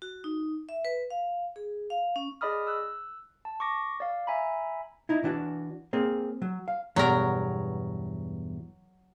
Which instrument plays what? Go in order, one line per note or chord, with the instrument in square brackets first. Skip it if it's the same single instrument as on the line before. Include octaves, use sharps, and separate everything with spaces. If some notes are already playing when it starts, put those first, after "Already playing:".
[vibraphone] F#4
D#4
E5
B4
F5
G#4
F5
C#4
[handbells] G#4 D5 D#5 B5 D#6 F6
E6 F#6
A5
C#6 D6 A#6
D5 F5
E5 G#5 A#5 B5
[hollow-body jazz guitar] D#4 E4
E3 D4 F#4
A#3 C4 G#4
F#3
F5
[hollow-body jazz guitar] E2 G2 B2 [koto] F#3 A#4